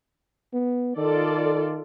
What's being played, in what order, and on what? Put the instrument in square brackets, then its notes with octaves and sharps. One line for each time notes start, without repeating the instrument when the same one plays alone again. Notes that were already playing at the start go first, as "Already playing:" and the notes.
[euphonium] B3
[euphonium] D#3 [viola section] F4 A4 D5